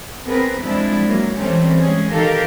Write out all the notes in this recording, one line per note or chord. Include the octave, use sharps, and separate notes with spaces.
B3 C4 G#4 A#4 B4
F3 G3 G#3 C4 D4 E4
F#3 A#3
E3 G3 A3 C4 C#4
G#3 C#4 G#4
D#3 G4 A4 A#4 F5